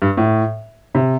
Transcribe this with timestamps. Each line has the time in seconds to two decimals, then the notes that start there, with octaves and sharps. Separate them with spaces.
0.02 G2
0.17 A2
0.95 C3